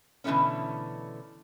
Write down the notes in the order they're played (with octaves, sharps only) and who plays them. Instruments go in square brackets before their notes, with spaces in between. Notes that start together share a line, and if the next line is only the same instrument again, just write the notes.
[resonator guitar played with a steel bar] B2 D3 E3 A3 B3 C#4